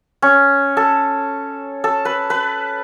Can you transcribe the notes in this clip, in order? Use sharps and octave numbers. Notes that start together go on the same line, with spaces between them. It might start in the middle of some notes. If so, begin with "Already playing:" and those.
C#4
A4
A4
B4
B4